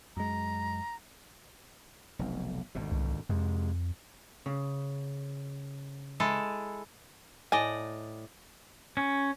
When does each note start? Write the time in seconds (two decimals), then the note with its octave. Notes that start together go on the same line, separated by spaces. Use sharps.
0.17 F#2 G#3 A#5
2.19 F1 B1
2.75 G#1 D2 B2
2.92 C2
3.29 F2 C3 G#3
4.46 C#3
6.20 G#3 E4 A4
7.52 A2 D5 D#5 G#5
8.97 C#4